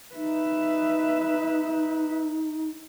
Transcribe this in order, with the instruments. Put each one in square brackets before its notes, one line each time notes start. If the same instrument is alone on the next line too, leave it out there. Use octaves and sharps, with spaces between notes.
[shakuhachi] D#4 [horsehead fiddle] B4 E5